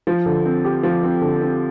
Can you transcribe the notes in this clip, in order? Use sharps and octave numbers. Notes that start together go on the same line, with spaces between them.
F3
D3
C4
G4
F3
C4
D3
C4